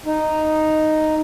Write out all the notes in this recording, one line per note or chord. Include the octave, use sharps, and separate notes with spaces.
D#4